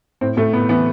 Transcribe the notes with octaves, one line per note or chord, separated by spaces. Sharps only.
A2 C4
A2 A3
A2 B3
E3 B3